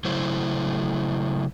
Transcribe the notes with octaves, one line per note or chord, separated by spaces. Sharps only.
C#3 F#3 A3 E4 C5